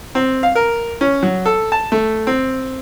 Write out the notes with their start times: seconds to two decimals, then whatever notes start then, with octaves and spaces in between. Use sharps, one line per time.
0.15 C4
0.43 F5
0.55 A#4
1.01 C#4
1.23 F#3
1.46 A4
1.72 A5
1.92 A3
2.27 C4